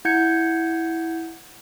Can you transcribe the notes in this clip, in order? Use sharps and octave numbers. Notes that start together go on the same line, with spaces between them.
E4 F#5 G6 G#6 C#7